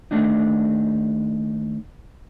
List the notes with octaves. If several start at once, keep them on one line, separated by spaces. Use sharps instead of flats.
D#2 A3 D4 D#4